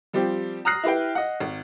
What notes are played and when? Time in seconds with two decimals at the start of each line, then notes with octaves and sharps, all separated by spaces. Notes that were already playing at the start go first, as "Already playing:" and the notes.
0.13 F3 G3 C4 G4
0.65 A#5 D#6 F6 F#6 A#6 C7
0.83 E4 G4 B4 G5
1.15 D#5 F#5
1.40 G#1